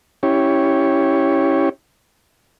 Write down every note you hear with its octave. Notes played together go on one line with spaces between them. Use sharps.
C#4 E4 G4 C#5